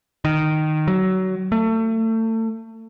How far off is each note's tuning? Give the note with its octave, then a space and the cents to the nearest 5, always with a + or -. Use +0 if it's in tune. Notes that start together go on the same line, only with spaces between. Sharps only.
D#3 -10
F#3 +20
A3 +30